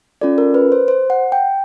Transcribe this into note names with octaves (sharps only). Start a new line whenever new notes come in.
C#4 F4 A4 D5
A#4
B4
C5
C5
F#5
G5